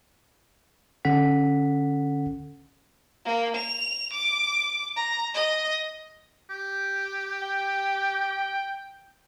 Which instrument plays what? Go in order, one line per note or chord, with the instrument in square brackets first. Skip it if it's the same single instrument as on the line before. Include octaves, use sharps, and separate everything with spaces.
[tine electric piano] D3 C#4 A4 F#5 B6
[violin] A#3
F7
D6
A#5
D#5
[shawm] G4
[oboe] G5